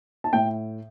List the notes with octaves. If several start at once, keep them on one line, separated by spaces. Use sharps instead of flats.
A5
A2 G5